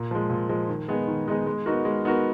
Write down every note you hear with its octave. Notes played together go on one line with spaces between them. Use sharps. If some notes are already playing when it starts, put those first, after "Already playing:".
Already playing: A#2
F3 G#3
A#2
F3 G#3
D#3
G#3 B3 D#4 G#4
D#3
G#3 B3 D#4 G#4
G#3
B3 D#4 F#4 A#4
G#3
B3 D#4 F#4 A#4